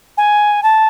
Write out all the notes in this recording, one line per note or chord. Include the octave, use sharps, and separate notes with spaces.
G#5
A5